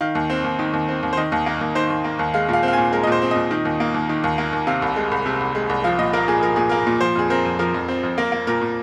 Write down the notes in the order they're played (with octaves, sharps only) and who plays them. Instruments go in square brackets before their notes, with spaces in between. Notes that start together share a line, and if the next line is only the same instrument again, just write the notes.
[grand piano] D#3 F5
D#2
C4
D#2
D#3
D#2
C4
D#2
C5
D#3 D#5
D#2
A#3
D#2
D#3 C5
D#2
A#3
D#2
G#3 F5
A#2 F5
C4
F5
A#2 G#5
G#3 A#4
D#5
A#2 C5
C4
A#2 D#5
D#3
D#2
A#3
D#2
D#3
D#2
A#3
D#2
C3 F5
C2
G#3
C2
C3
C2
G#3
C2
F3 F5
A#2 D#5
A#3 A#4
A#2 G#4
F3 A#4
A#2 G#4
A#3 A#4
A#2
F3 C5
F2 G#4
C4 A#4
F2
F3 A#4
F2
C4
F2
A#3 A#4
A#3
A#2 A#4
A#2